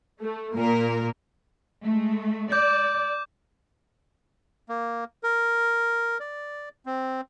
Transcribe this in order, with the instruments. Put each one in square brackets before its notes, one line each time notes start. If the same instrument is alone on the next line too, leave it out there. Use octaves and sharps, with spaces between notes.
[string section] A3
A#2 A#3 A#4
[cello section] G#3 A3
[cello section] D5 [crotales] D6 G6
[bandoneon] A#3
A#4
D5
C4